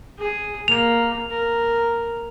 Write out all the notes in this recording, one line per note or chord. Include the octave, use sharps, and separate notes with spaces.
G#4
A#3 F7
A#4